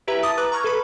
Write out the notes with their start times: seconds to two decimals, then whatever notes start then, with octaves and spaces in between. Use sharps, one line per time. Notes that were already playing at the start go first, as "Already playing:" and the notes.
0.07 E4 G4 B4 E5 A#5
0.22 A5 D6 D#6 A6
0.38 B4 A#5 D6 F#6
0.52 A#5 C#6 F6 G#6
0.64 A4 B4 B5